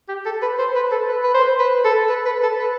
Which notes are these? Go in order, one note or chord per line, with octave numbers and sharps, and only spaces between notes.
G4
A4
B4
C5
B4
A4
B4
B4
C5
B4
A4
B4
B4
A4
B4